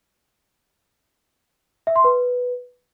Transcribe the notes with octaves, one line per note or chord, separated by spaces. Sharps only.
E5
C6
B4